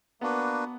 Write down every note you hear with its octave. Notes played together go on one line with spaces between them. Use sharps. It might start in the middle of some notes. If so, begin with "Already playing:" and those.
A#3 B3 D4 F#4 B4